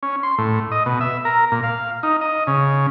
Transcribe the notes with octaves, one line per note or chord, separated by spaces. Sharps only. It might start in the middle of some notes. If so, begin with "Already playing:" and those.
C#4
C6
A2
D#5
B2
E5
A#4
A#2
F5
D#4
D#5
C#3